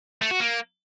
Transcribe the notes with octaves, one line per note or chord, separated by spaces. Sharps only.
A3
F#4
A#3